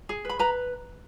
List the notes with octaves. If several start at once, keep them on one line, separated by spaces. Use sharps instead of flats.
G#4
B4 B5
B4 A#5